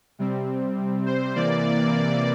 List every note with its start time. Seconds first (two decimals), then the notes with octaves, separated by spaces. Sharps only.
0.19 C3 G3 C4
1.06 C5
1.35 C3 E3 A#3 D5